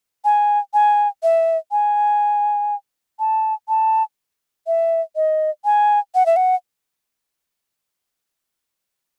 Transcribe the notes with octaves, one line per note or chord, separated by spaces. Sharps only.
G#5
G#5
E5
G#5
A5
A5
E5
D#5
G#5
F#5
E5
F#5